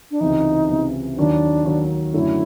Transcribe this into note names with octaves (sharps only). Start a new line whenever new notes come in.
D4
C#2 C3 E3 D#4
C#2 C3 E3
D#2 D#3 F#3 D4
D#2 D#3 F#3
F#2 D3 F#3 A3 E4